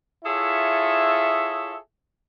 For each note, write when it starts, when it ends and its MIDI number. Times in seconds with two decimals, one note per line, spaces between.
0.24 1.76 64
0.24 1.76 65
0.24 1.76 68
0.24 1.76 69
0.24 1.76 73
0.24 1.76 76